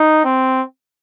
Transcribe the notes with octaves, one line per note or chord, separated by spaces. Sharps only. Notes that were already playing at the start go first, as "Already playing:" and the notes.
Already playing: D#4
C4